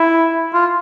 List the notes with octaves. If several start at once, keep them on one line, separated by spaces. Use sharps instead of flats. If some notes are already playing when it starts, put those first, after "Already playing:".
Already playing: E4
F4